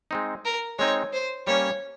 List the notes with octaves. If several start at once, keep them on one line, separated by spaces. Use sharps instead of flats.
G#3 C4 D#4
A#4
G#3 C4 D#4 C#5
C5
G3 A#3 C#4 C#5